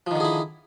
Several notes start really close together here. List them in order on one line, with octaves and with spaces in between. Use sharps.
F3 D#3 D3 G#4 E4